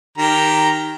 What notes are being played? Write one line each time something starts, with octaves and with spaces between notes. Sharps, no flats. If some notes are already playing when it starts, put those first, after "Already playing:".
D#3 G4 A#5